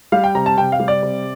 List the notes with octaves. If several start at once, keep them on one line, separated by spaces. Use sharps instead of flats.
G3 F5
G5
C3 A#5
A5
C3 G5
F5
G3
D5
C3